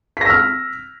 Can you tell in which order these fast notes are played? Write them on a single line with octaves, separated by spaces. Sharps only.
B6 A#6 E6 F6